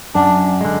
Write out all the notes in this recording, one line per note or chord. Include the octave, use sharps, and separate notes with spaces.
F#2 D4
D3 G#3